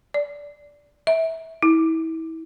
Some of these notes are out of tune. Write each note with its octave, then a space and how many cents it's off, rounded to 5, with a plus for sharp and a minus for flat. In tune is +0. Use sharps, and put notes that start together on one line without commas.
D5 -10
E5 -20
E4 -30